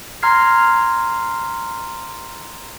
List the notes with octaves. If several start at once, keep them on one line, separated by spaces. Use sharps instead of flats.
A#5 C6 F6 G#6 C7